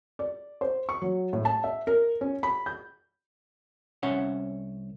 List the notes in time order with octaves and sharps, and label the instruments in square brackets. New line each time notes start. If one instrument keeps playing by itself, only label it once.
[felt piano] D5
C5
C#6
F#3
A2
A5
E5
A#4
C#4
B5
G6
[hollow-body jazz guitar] C2 C#4 C#5 E5 F#5